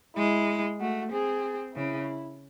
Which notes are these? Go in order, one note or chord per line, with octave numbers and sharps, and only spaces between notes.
G#3 E4
A3 F#4
C4 G#4
C#3 E4